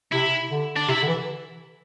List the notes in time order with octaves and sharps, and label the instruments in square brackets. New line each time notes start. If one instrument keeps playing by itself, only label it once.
[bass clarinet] C3 [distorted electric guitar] E4
[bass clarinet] D3
[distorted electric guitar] D4
[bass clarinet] C3 [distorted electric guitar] E4
[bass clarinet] D3
E3